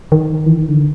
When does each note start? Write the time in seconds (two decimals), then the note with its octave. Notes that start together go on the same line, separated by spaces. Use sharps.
0.12 D#3
0.46 E3
0.58 D#3
0.68 D3